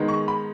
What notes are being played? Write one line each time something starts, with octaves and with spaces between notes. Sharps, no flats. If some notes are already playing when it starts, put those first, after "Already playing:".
Already playing: D#3 G#3 B3 D#4
C#6
B5